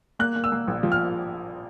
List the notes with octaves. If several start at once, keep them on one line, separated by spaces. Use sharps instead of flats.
A#3 F#6
A#3
E6
A#3
A#1
F3
F6